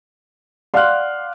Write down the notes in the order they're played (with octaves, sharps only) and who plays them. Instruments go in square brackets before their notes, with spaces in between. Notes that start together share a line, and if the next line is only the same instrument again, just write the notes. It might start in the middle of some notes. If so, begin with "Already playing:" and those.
[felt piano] D5 F5 F#5 [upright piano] C6 F6 F#6